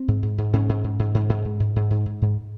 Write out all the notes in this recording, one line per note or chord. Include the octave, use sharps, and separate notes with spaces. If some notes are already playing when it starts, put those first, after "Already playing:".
Already playing: C4
G#2
G#2
G#2
G#2 C#4
G#2
G#2
G#2
G#2
G#2
G#2
G#2
G#2
G#2
G#2
G#2